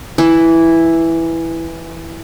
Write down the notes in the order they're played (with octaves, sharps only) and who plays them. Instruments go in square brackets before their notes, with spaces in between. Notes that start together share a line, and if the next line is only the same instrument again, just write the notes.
[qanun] E3 E4